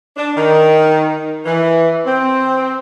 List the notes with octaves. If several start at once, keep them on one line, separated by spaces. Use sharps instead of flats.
D4
D#3
E3
C4